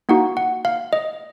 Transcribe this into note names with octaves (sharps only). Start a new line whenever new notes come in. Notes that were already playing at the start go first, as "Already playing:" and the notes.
A#3 D#4 F#4 F#5
F#5
F5
D#5